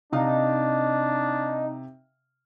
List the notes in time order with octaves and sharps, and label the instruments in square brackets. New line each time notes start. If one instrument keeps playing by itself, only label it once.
[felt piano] C3 F5 [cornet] D4 [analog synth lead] D#4